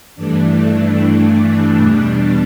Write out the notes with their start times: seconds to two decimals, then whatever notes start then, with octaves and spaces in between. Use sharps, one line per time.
0.16 G2 E3 A3 D4
0.56 D4
1.36 D4
1.76 E2 B2 G3